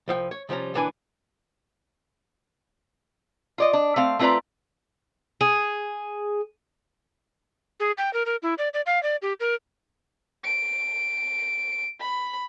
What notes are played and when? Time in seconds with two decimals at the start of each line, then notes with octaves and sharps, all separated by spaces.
0.08 C2 F3 F5 G5
0.31 C#5
0.49 C3 F3 G3 C#4 A#5
0.74 C#2 A#2 E3 D4 B4 G#5
3.58 F4 D5 D#5
3.73 D4
3.96 A3 C4 F5
4.19 A3 C4 F4 B4 D5 A#5
5.41 G#4
7.80 G#4
7.98 G5
8.13 A#4
8.26 A#4
8.42 E4
8.58 D5
8.74 D5
8.86 F5
9.03 D5
9.22 G4
9.40 A#4
10.44 D7
12.00 B5